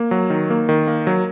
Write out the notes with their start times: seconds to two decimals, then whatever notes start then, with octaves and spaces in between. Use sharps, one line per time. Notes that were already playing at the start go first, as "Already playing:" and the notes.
Already playing: A#3
0.11 F#3
0.30 D#3
0.50 A#3
0.69 D#3
0.87 A#3
1.07 F#3